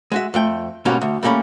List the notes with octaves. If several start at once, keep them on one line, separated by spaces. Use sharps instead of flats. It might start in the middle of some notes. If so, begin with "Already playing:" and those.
G#3 F#4 E5
F2 A3 G5
G#2 B2 G3 A#3 C#4 F#4
D2
G3 A3 A#3 C#4 B5